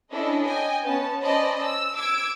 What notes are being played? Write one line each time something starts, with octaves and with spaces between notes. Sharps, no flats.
C#4 D4 E4 A4 D#5
D#5 G5 G#5
B3 C#4 A5
C#4 C5 D5 D#5 A5 B5
E6
D6 E6 G#6 D7